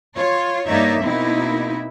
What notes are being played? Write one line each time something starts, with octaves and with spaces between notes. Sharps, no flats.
F4 C#5
G2 A#3 D#4 C#5 D5 E5
B2 A#3 C4 D#4 E4